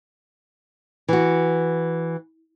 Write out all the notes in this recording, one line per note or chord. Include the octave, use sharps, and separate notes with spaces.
E3 F#4